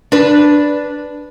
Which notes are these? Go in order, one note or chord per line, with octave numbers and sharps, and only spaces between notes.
D4 B4